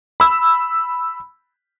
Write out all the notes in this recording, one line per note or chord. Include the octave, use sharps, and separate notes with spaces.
B5 E6